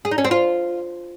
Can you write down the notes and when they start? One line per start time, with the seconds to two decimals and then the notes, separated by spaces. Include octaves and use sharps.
0.05 G#4
0.11 D#4
0.18 C#4
0.24 C4
0.31 F4